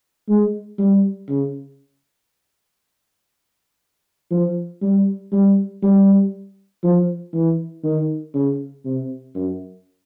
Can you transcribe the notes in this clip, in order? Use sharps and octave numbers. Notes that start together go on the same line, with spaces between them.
G#3
G3
C#3
F3
G3
G3
G3
F3
E3
D#3
C#3
C3
F#2